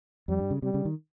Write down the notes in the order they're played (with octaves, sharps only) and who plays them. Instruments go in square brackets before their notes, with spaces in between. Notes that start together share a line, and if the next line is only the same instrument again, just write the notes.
[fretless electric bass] F2 [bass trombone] G3
[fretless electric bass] G2
C#3
[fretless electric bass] C3 [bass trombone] G3
[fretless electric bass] C#3
D#3